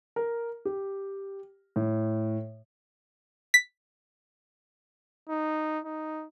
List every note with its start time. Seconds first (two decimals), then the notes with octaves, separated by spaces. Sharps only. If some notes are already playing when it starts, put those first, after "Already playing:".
0.16 A#4
0.65 G4
1.76 A2
3.54 B6
5.29 D#4
5.85 D#4